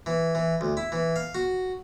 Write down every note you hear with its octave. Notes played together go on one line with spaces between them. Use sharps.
E3
E3
D2
E4
E3
F5
F#4